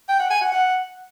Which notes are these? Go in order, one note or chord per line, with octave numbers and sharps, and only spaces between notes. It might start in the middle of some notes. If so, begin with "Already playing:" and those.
G5
F#5
G#5
F#5
F#5